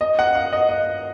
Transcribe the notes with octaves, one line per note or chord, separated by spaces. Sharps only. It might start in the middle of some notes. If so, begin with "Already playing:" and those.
D#5
F#5
F5
D#5
D#5